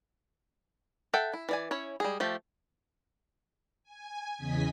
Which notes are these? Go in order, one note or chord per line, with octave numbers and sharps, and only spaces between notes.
A4 E5 F#5 G5
E4
E3 D5 G#5
C#4 E4 C#5
G3 G#3 G#4
F3 A3 G4
G#5
E2 C#3 D#5 G#5 B6